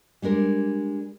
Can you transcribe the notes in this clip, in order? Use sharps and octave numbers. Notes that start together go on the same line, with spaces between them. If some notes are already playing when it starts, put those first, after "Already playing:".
G3 G#3 D4 A#4